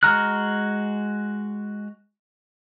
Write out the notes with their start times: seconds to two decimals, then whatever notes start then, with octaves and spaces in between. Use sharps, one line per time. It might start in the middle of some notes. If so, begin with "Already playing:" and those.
0.03 G#3 F#4 A#5 F6 F#6